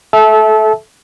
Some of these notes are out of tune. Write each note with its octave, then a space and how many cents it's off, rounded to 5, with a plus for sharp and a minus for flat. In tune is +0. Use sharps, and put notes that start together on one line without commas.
A4 -25 E5 -10 A5 -25